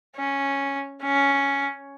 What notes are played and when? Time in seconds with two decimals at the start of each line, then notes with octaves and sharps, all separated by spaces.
0.16 C#4
1.03 C#4